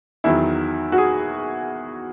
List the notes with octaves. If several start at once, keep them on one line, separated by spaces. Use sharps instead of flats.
E2 D#3 F#3 E4
F#4
G#4